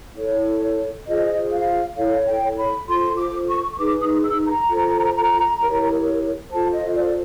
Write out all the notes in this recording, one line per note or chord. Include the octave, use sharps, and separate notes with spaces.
E4 A4 C#5
F4 G#4 C5 D#5
F5
E4 A4 C#5 F5
G5
B5
F4 A4 C5 C6
D6
C#6
C#6
D#4 G#4 B4 D6
D#6
E6
A#5
F4 A4 C5
E4 G4 A#4 C#5
F4 A4 C5 A5
D#5
D5